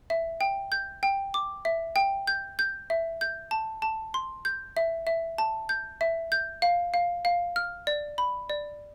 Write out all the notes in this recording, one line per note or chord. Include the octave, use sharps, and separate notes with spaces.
E5
G5
G6
G5
D6
E5
G5
G6
G6
E5
G6
A5
A5
C6
G6
E5
E5
A5
G6
E5
G6
F5
F5
F5
F6
D5
B5
D5